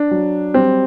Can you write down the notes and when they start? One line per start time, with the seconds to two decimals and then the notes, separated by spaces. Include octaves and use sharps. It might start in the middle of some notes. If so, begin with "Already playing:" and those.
Already playing: D4
0.11 F#3
0.54 G3 C4